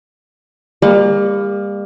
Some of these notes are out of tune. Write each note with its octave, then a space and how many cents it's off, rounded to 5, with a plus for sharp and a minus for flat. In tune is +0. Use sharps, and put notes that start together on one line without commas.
G3 +40 A#3 +0 D6 +0